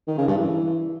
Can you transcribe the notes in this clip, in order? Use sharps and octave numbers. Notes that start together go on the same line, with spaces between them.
D#3
C#3
G2
E3